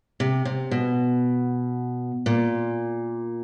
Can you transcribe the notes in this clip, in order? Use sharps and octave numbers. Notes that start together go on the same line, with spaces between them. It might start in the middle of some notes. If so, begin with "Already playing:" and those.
C3
C3
B2
A#2